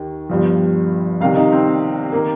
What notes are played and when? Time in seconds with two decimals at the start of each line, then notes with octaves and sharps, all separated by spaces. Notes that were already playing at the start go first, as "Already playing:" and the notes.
Already playing: D#2 D#3
0.29 G1 G2 F3
1.21 C2 C3 D#3 F5
1.36 D#4
1.52 C4
2.12 D#3 A#3